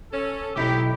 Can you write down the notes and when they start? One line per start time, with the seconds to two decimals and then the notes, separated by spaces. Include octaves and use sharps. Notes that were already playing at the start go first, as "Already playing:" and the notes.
0.12 C#4 A4
0.56 B1 C4 D#4 E4 G4